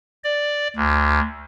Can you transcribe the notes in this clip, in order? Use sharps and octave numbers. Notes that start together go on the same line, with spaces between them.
D5
D2